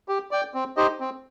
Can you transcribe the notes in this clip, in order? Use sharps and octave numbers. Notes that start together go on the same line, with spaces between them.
G4
D5 G5
C4
D#4 G4 C5 D#5
C4